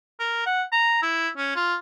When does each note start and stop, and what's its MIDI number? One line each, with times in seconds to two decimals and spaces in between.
0.20 0.42 70
0.46 0.63 78
0.72 0.99 82
1.03 1.28 64
1.37 1.54 61
1.56 1.75 65